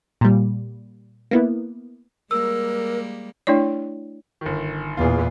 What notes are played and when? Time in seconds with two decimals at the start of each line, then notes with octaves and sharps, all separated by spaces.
0.21 A#2 G3
1.31 A#3 B3 E4
2.31 G3 G#3 A#3 A#4 E6
3.47 A3 D4 E4 C#5 D5
4.41 G1 D#3
4.97 E2 A#2 F4 G#4